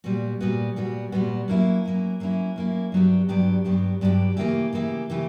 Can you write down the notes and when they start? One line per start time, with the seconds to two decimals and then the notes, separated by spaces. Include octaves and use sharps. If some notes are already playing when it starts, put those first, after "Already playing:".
0.04 A#2 G3 B3 F#4
0.40 A#2 G3 B3 F#4
0.76 A#2 G3 B3 F#4
1.12 A#2 G3 B3 F#4
1.48 F#3 A#3 C#4 E4
1.84 F#3 A#3 C#4 E4
2.20 F#3 A#3 C#4 E4
2.56 F#3 A#3 C#4 E4
2.92 G2 F#3 B3 D4 G4
3.29 G2 F#3 B3 D4 G4
3.64 G2 F#3 B3 D4 G4
4.01 G2 F#3 B3 D4 G4
4.37 C#3 E3 A#3 E4 G4
4.73 C#3 E3 A#3 E4 G4
5.10 C#3 E3 A#3 E4 G4